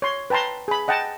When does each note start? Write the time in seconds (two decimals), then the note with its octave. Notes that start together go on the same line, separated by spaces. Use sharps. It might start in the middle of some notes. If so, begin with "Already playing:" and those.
0.02 C#5 C6
0.30 B4 G5 A5 A#5 C6
0.68 G#4 B5
0.88 D#5 F#5 G5 A5